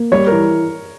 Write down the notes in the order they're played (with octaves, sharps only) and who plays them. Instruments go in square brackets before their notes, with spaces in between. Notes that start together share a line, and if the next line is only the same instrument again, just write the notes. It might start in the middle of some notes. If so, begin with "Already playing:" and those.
Already playing: [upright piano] A#3
[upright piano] G3 [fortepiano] C#5
[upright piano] E3 [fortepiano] A#4